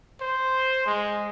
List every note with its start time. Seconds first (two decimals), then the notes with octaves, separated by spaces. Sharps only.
0.21 C5
0.86 G#3